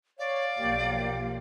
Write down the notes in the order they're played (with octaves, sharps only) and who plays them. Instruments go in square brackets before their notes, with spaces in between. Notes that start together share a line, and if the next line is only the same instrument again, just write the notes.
[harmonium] C#5 [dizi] D5 [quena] F5
[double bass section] B1 F3 A#3 [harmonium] G4